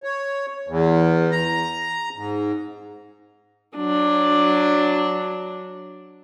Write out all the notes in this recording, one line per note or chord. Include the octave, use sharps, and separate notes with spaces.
C#5
E2
A#5
G#2
F#3 D4